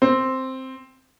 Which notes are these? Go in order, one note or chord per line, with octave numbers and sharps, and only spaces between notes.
C4